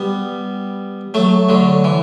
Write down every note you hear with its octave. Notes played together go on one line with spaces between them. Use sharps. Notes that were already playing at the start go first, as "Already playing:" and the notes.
Already playing: G3 B3
F#3 A3
D3 F#3
E3